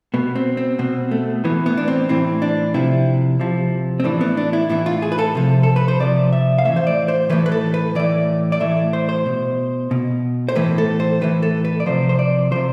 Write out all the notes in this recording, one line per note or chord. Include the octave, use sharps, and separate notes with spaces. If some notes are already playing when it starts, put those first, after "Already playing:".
B2 B3
C4
C4
B2 C4
A3
A2 E3 B3
B3
D4
C4
A2 E3 C4
D4
C3 F3 E4
C3 F3
C4
A2 E3 D4
B3
D4
E4
A2 E3 E4
F4
G#4
B4
A4
C3 F3
A4
B4
C5
C3 F3 D5
E5
F5
A2 E3 E5
C5
D5
C5
A2 E3 B4
B4
A4
B4
A2 E3 D5
D5
A2 E3 E5
C5
C5
B2
B2
C5
A2 E3 B4
A4
C5
A2 E3 B4
A4
B4
D5
C3 F3 C5
C5
D5
C3 F3 C5